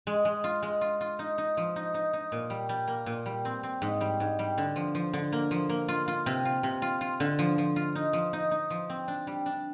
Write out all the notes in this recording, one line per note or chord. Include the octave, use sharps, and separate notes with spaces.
G#3
G#3
F4
G#3
F4
F4
D#4
D#4
F3
D#4
D#4
D#4
A#2
G3
G3
A#3
A#2
G3
C4
C4
G#2
G3
G#2
G3
D3
F3
F3
D3
A#3
F3
A#3
F4
F4
C3
F4
C3
F4
F4
D3
F3
F3
F4
D#4
F3
D#4
D#4
F3
C4
D4
G3
D4